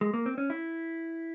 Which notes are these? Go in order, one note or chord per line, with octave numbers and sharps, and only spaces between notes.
G#3
A#3
C4
C#4
E4